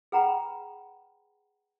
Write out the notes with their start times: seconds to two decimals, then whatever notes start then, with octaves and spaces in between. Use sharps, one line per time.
0.12 G#4 B4 F#5 G5 A#5 B5